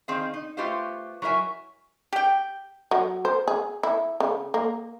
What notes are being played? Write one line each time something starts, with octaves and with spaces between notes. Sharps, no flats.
D#3 C4 G#4 F5
D#4
A3 F4 G4 B4 C5 F5
F#3 E4 A#4 E5 G#5
G4 G5
F#3
C5
G#4
E4
C#3
A#3